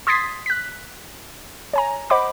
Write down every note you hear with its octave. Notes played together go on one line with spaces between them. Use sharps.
C6 D#6 G#6 A6 B6 C7
F#6 B6
C#5 G#5 A#5
C5 D#5 F#5 B5 D6